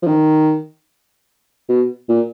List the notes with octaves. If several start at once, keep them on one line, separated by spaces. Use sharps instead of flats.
F3
D#3
B2
A#2